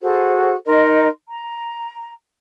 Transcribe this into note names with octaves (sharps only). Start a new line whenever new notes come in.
F#4 G#4 A4 C5
D#4 A#4 D#5 C6
A#5